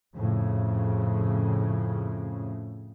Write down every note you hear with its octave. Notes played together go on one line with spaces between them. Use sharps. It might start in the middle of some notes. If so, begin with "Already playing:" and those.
F2 A2 C#3